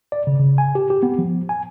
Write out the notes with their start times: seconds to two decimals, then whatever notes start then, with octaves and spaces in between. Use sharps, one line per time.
0.12 D5
0.27 C#3
0.39 C#3
0.58 G#5
0.75 G4
0.90 G4
1.03 B3
1.19 F3
1.49 G#5